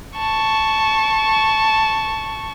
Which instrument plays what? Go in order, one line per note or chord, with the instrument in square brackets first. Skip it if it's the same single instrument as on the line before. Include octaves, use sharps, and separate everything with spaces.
[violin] A5 C#6